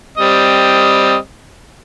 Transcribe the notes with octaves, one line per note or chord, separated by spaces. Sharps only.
G3 C4 D#5